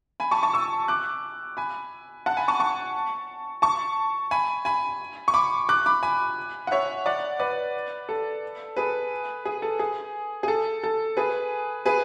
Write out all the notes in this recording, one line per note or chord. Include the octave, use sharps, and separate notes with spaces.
G#5 B5
A5 C#6
A5 C#6
C#6 E6
D6 F#6
G#5 B5
F#5 A5
G#5 B5
A5 C#6
A5 C#6
A5 C#6
G#5 B5
G#5 B5
C#6
B5 D6
D6 F#6
B5 D6
G#5 B5
F#5
C#5 E5
D5 F#5
B4 D5
A4
G#4 B4
G#4
A4
G#4
G#4
A4
A4
G#4 B4
G#4 B4